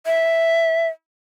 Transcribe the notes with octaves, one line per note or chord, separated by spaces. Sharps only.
E5